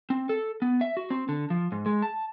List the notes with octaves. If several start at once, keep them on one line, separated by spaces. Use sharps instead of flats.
C4
A4
B3
E5
F#4
C4
D3
F3
G#2
G#3
A5